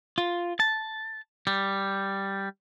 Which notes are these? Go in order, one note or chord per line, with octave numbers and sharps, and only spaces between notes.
F4
A5
G3